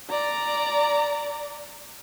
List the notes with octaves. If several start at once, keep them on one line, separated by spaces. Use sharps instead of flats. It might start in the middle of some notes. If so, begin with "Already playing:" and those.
D5 A#5